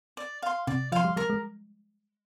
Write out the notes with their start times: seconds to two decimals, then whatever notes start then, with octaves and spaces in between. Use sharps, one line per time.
0.17 D5
0.42 F5 C6
0.67 C3 D5
0.92 F3 F5 C6
1.05 G3
1.16 G3 A#4
1.30 G#3